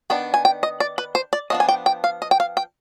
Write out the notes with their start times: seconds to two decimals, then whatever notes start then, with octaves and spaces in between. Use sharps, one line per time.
0.10 D#3 B3 D4 G5
0.34 G#5
0.45 G5
0.63 D#5
0.80 D5
0.98 B4
1.15 C5
1.33 D5
1.50 F3 B3 D4 D#5
1.60 G#5
1.69 G5
1.86 G5
2.04 F5
2.22 D#5
2.31 G5
2.40 F5
2.57 G5